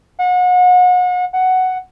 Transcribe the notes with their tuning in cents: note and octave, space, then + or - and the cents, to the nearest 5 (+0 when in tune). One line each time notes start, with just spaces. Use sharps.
F#5 -35
F#5 +5